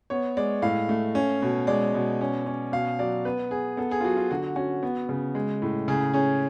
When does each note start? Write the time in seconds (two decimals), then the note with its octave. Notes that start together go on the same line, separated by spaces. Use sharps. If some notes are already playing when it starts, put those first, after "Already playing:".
0.10 B3 C#5
0.37 G#3 D5
0.62 A2 F5
0.89 A3
1.15 C#4
1.42 B2
1.67 G#3 D5
1.94 B2
2.21 C#4
2.46 C#4
2.72 B2 F5
2.99 F#3 D5
3.25 B3 B4
3.51 B3 G#4
3.77 B3 A4
3.91 G#4
4.00 F4
4.04 F#3 F#4
4.17 F4
4.31 D3 F#4
4.56 C#4 F#4
4.83 B3
5.09 C#3
5.35 G#3
5.62 A2
5.88 C#3 G#4
6.14 C#4 G#4